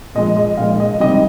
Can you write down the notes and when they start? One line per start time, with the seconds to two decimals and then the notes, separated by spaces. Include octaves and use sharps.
0.15 A#2 F3 G#3 D#5
0.37 D#5
0.57 A#2 F3 G#3 F5
0.80 D#5
1.00 C3 D#3 G3 D#5